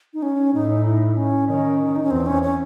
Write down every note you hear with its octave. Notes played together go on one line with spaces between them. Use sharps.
D#4
C#4
A2 D#4
E4
C#4
D#3 C#4
D#4
C#4
E2 C4
C#4
C#4